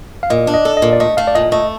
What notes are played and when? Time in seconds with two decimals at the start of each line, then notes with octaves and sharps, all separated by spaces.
0.23 F5
0.30 A#2 D#5
0.47 D4
0.54 D#5
0.65 A4
0.77 D#5
0.82 A#2
0.93 D5
1.00 A3 D#5
1.17 A3 F5
1.28 D5
1.35 A#2 D#5
1.52 A3 D#5